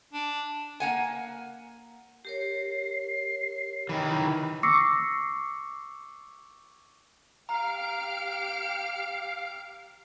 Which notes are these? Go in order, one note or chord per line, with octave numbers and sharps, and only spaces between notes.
D4
A#3 F#5 G#5
G4 A#4 C#5 C7
D#3 E3 B5
C#6 D6 E6 A#6 C7 C#7
G4 F5 A#5 F6 D7